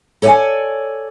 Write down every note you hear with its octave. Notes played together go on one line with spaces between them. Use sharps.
A4 C#5 D5 F#5 G#5